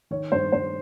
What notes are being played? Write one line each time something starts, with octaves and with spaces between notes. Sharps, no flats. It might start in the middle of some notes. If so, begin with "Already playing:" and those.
D#3 C#5
G2 C5
G2 C5